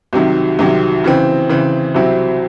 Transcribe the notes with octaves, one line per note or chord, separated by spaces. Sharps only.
C2 C3 D#3 F#3
C2 C3 D#3 F#3
C#3 E3 C4
C#3 E3 C4
C2 C3 F#3 C4 E4